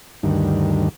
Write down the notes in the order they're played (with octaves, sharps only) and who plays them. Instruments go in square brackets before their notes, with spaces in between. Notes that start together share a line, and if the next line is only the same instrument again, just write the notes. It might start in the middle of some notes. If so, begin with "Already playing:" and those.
[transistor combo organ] D2 G2 D#3